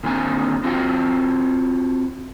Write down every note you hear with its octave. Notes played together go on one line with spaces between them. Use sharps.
A#2 D3 D#3 C4 G#5
C4 F4 F#4 G5